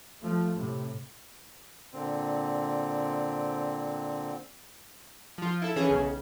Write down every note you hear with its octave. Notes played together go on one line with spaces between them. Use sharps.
F3 A3
A2 C3
A#2 D3 C4
F3 F4
E4 A4
E3 C#4 G#4
B1 C#3